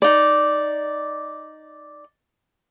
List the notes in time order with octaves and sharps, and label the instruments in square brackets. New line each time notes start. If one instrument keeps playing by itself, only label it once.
[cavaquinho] D#4 D5